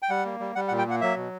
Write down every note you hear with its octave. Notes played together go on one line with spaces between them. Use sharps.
G5
G3 F#5
A#3
G3
G3 F#5
F#5
A#2
G5
A#3 F#5
F#3 E5
B2